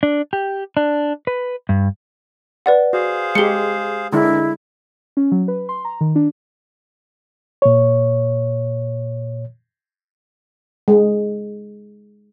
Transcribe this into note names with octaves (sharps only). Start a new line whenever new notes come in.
D4
G4
D4
B4
G2
B4 D5 F#5
F#4 G#4 C5 F5
G#3 G4 C#7 G7
D3 G#3 C4 D4 E4 A#4
C#4
F#3
B4
C6
A#5
D#3
D4
A#2 C#5
G#3